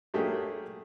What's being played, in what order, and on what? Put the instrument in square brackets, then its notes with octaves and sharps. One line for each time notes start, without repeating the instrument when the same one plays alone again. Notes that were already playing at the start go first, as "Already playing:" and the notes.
[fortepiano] F#3 A3 A#3 G4 G#4